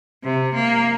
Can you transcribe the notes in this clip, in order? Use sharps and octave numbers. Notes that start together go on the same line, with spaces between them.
C3
A#3